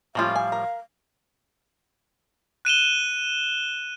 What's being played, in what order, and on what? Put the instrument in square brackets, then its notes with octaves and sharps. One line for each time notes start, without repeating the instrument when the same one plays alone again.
[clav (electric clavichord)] A2 F3 G3 [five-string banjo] A#3 C#4 F4 [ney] F5
[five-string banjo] G#5
A#4
[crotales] F#6 D#7 E7 G7